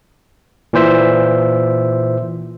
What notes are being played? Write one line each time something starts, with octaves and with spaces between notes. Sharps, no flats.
A#2 E3 C5 E5